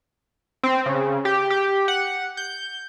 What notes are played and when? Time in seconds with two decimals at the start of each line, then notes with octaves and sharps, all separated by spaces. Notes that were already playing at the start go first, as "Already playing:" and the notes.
0.63 C4
0.86 C#3
1.25 G4
1.50 G4
1.88 F#5
2.37 G6